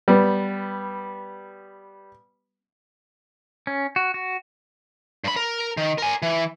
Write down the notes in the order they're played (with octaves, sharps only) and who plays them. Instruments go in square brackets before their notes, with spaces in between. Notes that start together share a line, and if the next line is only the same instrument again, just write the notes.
[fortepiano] G3 B3
[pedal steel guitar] C#4
F#4
F#4
[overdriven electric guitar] G2 B5
A#4
D#3
A#4 G#5
E3